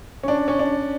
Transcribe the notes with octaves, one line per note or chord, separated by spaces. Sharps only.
C#4
D4
C#4
D4